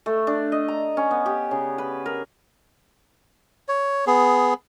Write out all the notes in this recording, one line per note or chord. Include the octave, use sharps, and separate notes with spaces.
A3
D4
D#5
A#5
C#4
B3
G4
C#3
B4
A#4
C#5
B3 G#4